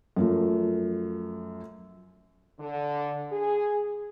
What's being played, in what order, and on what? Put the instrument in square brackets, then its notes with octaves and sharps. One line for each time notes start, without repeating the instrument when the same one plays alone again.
[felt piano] F#2 F3 A3
[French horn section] D3
G#4